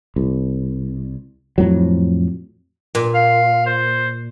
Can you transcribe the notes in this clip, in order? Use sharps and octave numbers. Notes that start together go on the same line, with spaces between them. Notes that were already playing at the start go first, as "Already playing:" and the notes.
C2
F2 A2 F#3
A#2
F5
C5